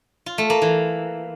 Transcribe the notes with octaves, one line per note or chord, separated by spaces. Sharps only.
F4
A3
A#3
E3